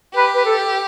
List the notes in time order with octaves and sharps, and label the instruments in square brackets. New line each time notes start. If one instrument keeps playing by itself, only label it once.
[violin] G4 [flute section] B4
[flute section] B4
A4